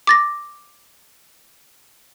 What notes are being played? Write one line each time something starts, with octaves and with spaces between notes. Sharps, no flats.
D6 A6 A#6